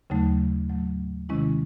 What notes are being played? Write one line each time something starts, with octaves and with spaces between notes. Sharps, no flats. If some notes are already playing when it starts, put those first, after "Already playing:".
D#2 C#3 F#3 A3 D#4
A2 F#3 A3
C3 D#3 G#3 C#4 E4